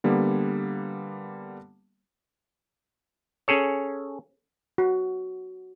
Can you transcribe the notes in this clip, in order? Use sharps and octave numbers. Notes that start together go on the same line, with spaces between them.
D3 G3 A#3 B3
C#4 G#4 A4 C#5
F#4